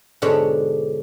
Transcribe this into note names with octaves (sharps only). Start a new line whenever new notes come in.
G#2 B2 D3 D4 G4 C#5